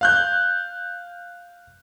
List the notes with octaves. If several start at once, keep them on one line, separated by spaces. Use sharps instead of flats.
F5 F#6 G6